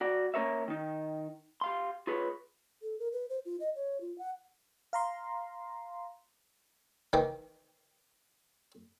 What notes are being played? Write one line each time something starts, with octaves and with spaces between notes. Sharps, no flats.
F#4 D5
A#3 C#4 A#4 C#5 E5
D#3 D#4
G4 F5 C6
F4 G#4 B4 C#5
A4
A#4
B4
C5
F4
D#5
C#5
F4
F#5
F5 A#5 C6
D#3 E3 G5 D#6